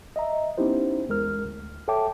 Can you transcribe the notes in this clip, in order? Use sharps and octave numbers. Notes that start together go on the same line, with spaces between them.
D#5 E5 A#5
B3 C#4 D#4 E4 G4 C5
E2 G#3 A#4 F6
D2
A4 C#5 E5 G5 A5 D6